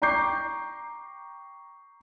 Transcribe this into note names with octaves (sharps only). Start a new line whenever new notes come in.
G5 A#5 C#6 D6 G6 C7